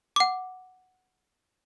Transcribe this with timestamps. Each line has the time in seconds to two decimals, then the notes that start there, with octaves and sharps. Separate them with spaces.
0.16 F#5 D6